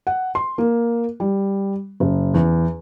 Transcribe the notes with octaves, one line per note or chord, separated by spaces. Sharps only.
F#5
C6
A#3
G3
F#1
E2